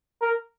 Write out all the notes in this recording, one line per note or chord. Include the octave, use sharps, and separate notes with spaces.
A#4